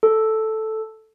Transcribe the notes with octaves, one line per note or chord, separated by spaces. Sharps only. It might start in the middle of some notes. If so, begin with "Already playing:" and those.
A4